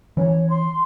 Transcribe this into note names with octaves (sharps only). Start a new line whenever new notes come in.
E3 C#4 C#5
C6